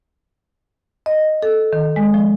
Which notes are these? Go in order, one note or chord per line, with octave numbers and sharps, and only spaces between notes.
D#5
A4
D#3
G#3
F3